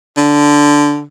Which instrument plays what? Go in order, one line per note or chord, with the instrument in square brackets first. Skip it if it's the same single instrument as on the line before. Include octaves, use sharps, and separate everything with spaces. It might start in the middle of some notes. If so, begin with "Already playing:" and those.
[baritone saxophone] D3